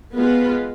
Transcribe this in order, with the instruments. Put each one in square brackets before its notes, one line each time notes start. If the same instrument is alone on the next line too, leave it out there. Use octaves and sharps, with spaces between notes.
[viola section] G#3 B3 F4 B4